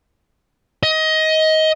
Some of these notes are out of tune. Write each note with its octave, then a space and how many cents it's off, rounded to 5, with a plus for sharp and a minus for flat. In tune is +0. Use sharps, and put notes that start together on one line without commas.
D#5 +20